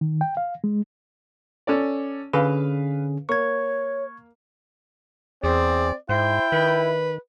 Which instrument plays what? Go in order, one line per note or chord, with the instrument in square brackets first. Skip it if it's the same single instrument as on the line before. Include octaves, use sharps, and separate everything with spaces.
[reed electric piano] D#3
G5
F5
G#3
[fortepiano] C#4 A4 D5
[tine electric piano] D3 C#4 G#4 [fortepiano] B4 F5
[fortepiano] A#3 [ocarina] C#5 [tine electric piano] C#6 G#6
[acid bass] E2 [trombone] C4 [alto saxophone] G#4 [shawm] D5
[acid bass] G#2 [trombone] E4 [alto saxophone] C5 [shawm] G5
[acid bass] D#3 [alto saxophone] B4